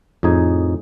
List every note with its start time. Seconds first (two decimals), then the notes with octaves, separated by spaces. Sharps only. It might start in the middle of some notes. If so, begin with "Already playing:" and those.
0.23 F2 A2 D#4 G#4 G#5